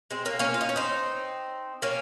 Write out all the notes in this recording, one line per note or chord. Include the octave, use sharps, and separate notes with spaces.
G#3 C4
A#3 C#4
A#3 C#4
F4
D#4
C#4
C4 D#4
A#3 C#4